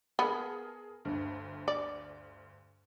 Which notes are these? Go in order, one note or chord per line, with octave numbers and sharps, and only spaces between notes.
B3 G#4 A#4 A5
G1 D2 G2
D5